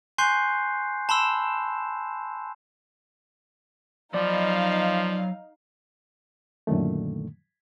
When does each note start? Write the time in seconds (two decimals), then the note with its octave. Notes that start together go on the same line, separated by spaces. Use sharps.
0.18 G#5 C6 C#6 F#6 G6 C7
1.09 A5 B5 C6 E6 E7
4.14 F3 F#3 D#4 D5 F5 B5
6.67 F#2 A#2 D3 D#3 A3